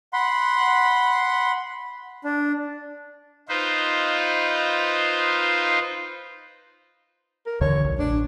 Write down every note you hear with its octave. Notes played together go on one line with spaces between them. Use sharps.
F#5 B5 C6
D4
D#4 F4 B4 C5
A#4
D#2 D3 E3 C#5
B1
A1 D4